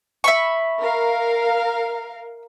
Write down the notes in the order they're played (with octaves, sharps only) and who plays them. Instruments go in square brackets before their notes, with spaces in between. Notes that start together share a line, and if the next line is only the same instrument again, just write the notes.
[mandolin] E5 B5 C#6
[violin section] A#4 F5